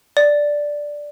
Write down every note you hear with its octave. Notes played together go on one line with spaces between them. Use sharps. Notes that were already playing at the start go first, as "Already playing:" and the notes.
D5